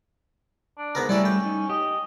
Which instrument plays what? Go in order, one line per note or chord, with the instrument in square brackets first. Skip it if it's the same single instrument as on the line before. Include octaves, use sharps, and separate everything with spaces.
[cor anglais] D4
[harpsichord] G#2 B3 A#4
[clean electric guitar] G3 A3 [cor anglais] C#4 [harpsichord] D4 E4 D5
[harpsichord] G5
[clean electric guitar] D#4
[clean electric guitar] G4 [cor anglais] D#5